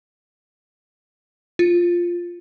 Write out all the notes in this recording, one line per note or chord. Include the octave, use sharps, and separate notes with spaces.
F4